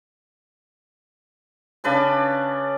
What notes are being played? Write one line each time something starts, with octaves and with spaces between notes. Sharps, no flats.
C#3 D4 B4 A5